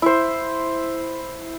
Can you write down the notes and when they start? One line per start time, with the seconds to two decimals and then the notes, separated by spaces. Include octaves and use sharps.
0.02 E4 C5